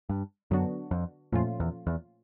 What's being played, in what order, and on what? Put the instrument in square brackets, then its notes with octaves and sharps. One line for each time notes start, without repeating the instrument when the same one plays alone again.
[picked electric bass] G2
[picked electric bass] F#2 [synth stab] D3 F#3 B3 D4 F#4
[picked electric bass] F2
[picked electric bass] F2 [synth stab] A#2 F3 A3 C#4 F4
[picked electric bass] E2
E2